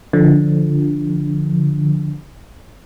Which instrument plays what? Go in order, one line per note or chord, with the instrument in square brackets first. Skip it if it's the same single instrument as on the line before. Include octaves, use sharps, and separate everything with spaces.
[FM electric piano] D3 F3